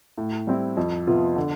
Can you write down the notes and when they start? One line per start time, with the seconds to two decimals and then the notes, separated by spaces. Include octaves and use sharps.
0.18 A2
0.47 G3 C4 E4
0.77 F2
1.07 C3 F3 B3 F4
1.36 D3